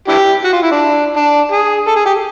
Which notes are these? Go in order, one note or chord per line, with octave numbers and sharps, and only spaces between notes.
D4 E4 G4
F#4
F4
E4
D4
D4
G#4
A4
G#4
G4